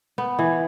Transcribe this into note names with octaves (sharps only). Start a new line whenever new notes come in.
B3
E3